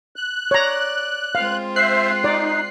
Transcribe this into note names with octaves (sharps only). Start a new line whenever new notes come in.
F#6
C#5 D5 A#5
G#3 C4 F4 F5
C5 E5 F#6 C7
D#4 D5